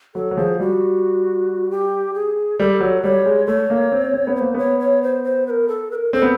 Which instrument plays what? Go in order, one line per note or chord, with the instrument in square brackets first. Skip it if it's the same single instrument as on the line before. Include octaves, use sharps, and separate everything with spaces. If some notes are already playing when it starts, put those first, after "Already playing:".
[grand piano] F#3 [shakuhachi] A4
[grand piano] F#3
[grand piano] F3 [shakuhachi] G#4
[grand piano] G3 [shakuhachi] F#4
[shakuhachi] G4
G#4
[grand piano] G3 [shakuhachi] A4
[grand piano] F#3
[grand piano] G3 [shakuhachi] C#5
[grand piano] G#3
[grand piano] A3 [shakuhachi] C#5
[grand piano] A#3
C4
C4
B3
[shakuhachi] C#5
[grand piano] A#3 [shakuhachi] C5
[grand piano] B3 [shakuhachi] C#5
[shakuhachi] C#5
C5
C5
B4
A#4
A4
B4
A#4
[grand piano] C4 [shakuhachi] A4
[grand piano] B3